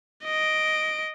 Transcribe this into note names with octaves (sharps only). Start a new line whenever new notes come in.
D#5 D7